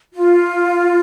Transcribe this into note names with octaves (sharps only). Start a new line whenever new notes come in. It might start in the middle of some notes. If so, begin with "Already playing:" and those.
F4